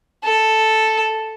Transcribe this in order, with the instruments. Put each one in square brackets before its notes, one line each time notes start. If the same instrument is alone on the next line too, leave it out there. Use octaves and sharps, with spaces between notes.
[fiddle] A4